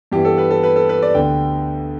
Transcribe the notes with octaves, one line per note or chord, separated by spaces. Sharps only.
G2 E3 B3 G4
A4
B4
A4
B4
A4
B4
D5
D2 D3 B3 G5